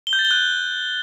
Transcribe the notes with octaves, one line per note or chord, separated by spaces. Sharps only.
G7
G6
A6
G7
F#6